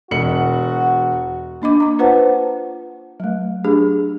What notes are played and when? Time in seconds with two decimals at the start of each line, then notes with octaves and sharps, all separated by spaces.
0.11 E1 F#4 C#7 F#7
1.62 A#3 D4 D#5 D6
1.80 A#5 D6
1.99 F4 B4 C5 F#5 A5
3.20 F#3 A3
3.64 D4 G4 G#4